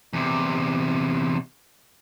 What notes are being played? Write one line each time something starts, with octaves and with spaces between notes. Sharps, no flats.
E2 C3